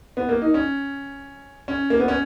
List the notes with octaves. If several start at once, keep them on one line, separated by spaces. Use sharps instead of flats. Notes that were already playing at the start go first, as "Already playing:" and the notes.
B3
A#3
D#4
C#4
C#4
A#3
B3
C#4